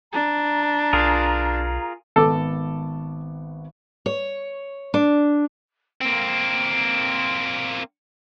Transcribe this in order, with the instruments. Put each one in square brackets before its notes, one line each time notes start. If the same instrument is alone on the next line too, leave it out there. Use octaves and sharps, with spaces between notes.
[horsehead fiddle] D4 [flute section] A#5
[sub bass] B1 [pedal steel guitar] F4 G#4 A#4
[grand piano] G#1 B3 D6 [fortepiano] A4
[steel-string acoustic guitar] C#5
D4
[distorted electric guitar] A#3 C4 [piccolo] D7